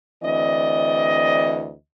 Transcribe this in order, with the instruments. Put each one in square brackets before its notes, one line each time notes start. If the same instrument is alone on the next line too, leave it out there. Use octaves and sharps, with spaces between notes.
[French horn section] D2 E3 C4 D5 D#5